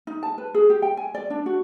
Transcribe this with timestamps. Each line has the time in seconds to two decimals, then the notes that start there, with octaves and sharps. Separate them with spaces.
0.07 D#4
0.23 A5
0.38 B4
0.54 G#4
0.70 G4
0.82 G5
0.97 G#5
1.15 D5
1.30 D4
1.46 F#4